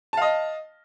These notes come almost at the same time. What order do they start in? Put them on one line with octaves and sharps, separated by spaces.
A5 F5 D#5